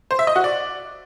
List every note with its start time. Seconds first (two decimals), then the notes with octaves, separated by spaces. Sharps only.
0.11 C5
0.19 E5
0.27 D#5
0.36 F#4
0.44 D5